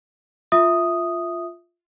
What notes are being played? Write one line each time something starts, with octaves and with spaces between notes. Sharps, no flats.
F4 E5 D#6